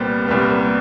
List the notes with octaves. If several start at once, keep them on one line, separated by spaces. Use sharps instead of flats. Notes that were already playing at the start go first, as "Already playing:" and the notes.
Already playing: C2 A#2 G3 B3 C5 D5
C2 A#2 G3 B3